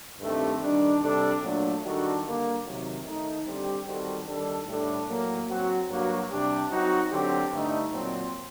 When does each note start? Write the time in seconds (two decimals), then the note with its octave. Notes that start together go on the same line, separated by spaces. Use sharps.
0.20 G2 D#3 A3 C4 G4
0.62 D#3 G3 D4
1.02 C3 G3 D4 A4
1.43 A#2 F#3 A3 D4
1.83 D#3 G3 D4 F#4 A4
2.24 D3 G3 A#3
2.64 C3 D#3 F#3
3.05 D#3 A3 D#4
3.46 D3 G3 C4 G4
3.87 D#3 G3 C4 F#4 A4
4.27 D#3 G3 D4 A4
4.67 A2 G3 D4 A4
5.08 A2 F#3 A#3
5.49 F#3 C4 F#4
5.89 G2 F#3 A#3 F#4
6.30 C3 G3 D4 G4
6.70 F#3 C4 D#4 F#4
7.11 D3 F#3 C4 G4
7.52 G2 D3 A3 D#4
7.93 A#2 F#3 C4